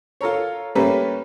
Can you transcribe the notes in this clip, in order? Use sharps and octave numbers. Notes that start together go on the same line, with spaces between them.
F4 A4 A#4 C#5
G3 A3 A#3 C#4 A#4 B4